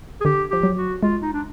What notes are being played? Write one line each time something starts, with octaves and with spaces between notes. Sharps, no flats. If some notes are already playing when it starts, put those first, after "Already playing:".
G#4
D3 G4
F3 G4
F#3
F#4
G#3 F4
D#4
D4